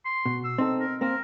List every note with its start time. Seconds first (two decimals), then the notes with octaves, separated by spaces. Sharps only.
0.05 C6
0.26 B2
0.44 E6
0.58 C4 D#4 A4
0.80 A#4
1.01 A#3 C4 A#4